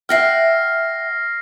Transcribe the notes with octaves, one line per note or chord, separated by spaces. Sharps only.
E5 F#5 G5 F6 A#6 C7